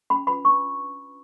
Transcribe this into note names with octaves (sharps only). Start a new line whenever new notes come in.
C#4 B5
F4 B4 B5
D4 C#6